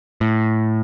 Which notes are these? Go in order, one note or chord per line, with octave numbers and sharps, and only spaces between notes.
A2